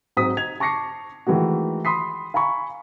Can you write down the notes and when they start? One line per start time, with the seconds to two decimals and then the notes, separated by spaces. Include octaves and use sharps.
0.17 G#2 F#3 C4 D#6 B6
0.37 D#4 G#6 F7
0.60 A5 C#6 D6 A#6 C7 C#7
1.27 D#3 E3 G#3 A3 F#4
1.85 B5 C6 D#6 B6 C7
2.34 F5 G#5 A#5 B5 C#6